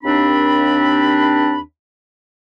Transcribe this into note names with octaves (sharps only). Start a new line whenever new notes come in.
D#2 C4 D4 B5